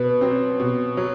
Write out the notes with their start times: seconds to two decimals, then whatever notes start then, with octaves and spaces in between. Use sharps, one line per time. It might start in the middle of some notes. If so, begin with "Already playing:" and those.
Already playing: B2 B4
0.21 F#3 C4
0.60 B2
0.97 F#3